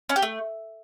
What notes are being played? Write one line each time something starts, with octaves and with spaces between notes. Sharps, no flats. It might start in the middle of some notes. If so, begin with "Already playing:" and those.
C#4
G4
A3